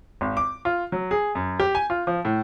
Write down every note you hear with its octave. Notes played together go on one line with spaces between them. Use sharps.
G#1
D6
F4
F#3
G#4
F#2
G4
G#5
F4
F3
A2